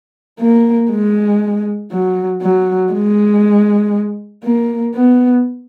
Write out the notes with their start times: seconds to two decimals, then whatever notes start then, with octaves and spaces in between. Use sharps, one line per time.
0.40 A#3
0.91 G#3
1.91 F#3
2.42 F#3
2.92 G#3
4.44 A#3
4.94 B3